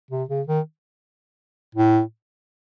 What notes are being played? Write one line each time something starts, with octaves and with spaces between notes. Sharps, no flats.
C3
C#3
D#3
A2